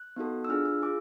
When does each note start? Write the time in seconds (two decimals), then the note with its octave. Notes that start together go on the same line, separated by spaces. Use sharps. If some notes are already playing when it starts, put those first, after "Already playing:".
Already playing: F#6
0.16 B3 D#4 F#4 A4
0.45 E6
0.49 D4 F4 G#4 F6
0.65 E6
0.82 F4 G#4 D6